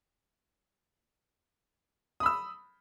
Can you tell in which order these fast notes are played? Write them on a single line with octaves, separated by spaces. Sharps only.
D#6 B5 E6